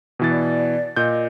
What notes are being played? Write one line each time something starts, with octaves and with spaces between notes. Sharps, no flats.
B2 E3 A6
D5
A#2 D#5 G6